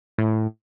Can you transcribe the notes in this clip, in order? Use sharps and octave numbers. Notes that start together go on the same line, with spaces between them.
A2